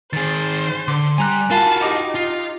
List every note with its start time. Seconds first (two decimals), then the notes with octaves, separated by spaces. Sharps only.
0.13 D#3 G#4 C5 A6
0.88 D3 C6 D6
1.18 G3 G#5 A#5 F#6
1.51 F4 F#4 A#4 F5 A5 B5
1.82 D#4 G4 D#5 D6
2.15 F4